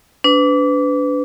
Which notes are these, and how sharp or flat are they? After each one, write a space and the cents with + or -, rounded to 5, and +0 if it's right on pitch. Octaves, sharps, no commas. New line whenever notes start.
D4 -25 B4 +25